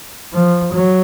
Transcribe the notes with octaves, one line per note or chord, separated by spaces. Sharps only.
F3
F#3